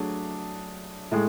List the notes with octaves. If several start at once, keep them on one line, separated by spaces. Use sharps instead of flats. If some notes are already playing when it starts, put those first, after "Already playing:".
Already playing: F#3 A3 D4 G#4
A2 G#3